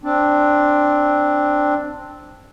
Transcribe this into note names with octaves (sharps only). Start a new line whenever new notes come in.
C4 D4